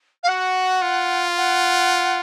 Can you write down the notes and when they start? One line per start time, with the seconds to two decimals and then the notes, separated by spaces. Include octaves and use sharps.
0.23 F5
0.28 F#4 F#5
0.82 F4
1.37 F#5